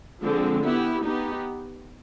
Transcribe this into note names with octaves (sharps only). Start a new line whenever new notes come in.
D3 F3 G#3 C4
B3 E4 G4
B3 D#4 G4